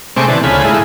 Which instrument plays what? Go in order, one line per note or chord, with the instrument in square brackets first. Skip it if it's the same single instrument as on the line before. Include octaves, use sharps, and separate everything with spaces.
[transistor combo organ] C3 G#3 A3 C4 C#6 D6
B2 D3 E3 A5
D2 C#3 A3 F4 G#5 B5
G#2 G#3 A3 E4